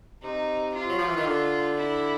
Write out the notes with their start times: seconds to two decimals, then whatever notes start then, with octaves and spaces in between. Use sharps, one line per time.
0.23 C3 D#4
0.75 F4
0.89 F#3
0.98 F3
1.07 E3
1.16 D#3
1.26 D3
1.78 E4